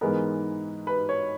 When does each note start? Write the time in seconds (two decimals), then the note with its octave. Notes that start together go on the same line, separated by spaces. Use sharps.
0.01 G#2 E3 G#3 B3 A#4
0.87 B4
1.09 C#5